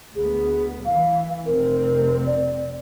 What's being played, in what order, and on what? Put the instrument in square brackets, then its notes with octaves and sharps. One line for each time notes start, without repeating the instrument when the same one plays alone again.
[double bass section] D2 B3 [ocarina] G#4
[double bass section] E3 [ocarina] F5
[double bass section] F1 C3 C4 [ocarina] A#4
[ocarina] D5